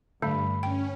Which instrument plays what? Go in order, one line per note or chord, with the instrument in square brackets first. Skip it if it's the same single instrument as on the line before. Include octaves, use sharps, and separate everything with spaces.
[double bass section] G2 [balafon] D3 A3 [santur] F5 B5
[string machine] C#4 [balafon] G5